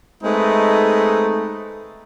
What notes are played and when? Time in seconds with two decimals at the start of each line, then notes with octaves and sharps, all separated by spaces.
0.23 G#3 A3 C4 D#4 B4